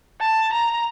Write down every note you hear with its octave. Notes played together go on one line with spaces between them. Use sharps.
A5
A#5